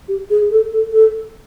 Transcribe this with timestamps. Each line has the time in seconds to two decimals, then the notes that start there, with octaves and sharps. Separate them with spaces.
0.08 G4
0.30 G#4
0.51 A4
0.72 A4
0.93 A4